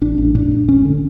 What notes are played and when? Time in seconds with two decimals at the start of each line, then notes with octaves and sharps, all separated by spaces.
0.01 A1 D4
0.18 A1
0.35 A2 D4
0.51 A2
0.68 E1 C#4
0.85 D3